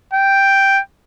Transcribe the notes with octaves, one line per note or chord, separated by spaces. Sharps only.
G5